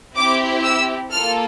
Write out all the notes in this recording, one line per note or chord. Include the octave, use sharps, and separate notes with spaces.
C4 E4 G4 D6
E6
A#3 F4 A4 F6